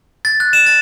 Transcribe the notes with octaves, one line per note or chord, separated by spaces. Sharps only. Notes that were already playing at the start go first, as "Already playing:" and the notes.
A6
F#6
E7
A6